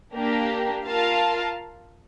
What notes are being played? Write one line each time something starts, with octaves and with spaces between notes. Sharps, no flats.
A#3 D4 G4 A#4
F4 A#4 F5 A5